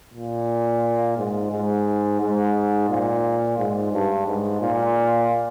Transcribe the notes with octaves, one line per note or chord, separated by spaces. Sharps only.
A#2
G#2
G#2
G#2
A#2
G#2
G2
G#2
A#2